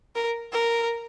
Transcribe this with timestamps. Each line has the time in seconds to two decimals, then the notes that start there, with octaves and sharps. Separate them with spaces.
0.15 A#4
0.53 A#4